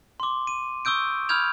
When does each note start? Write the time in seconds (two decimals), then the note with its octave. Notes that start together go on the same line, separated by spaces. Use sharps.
0.20 C6 D6
0.47 D#7
0.85 C#6 D#6 E6 G6 D7
1.29 B5 D#6 F6 G6 G#6 F7